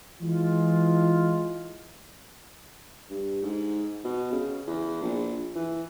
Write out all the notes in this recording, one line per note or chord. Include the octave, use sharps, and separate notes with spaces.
E3 G#3 F4
G2
G#2
B2
C#3
E2
A#1
E3